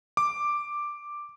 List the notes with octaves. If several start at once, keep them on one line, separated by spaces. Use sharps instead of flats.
D6